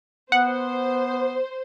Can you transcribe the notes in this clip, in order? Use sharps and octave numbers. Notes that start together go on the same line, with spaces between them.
B3 C5 F#5